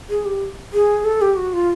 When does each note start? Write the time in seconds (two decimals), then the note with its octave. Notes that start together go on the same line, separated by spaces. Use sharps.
0.10 G#4
0.26 G4
0.73 G#4
1.05 A4
1.21 G4
1.36 F#4
1.53 F4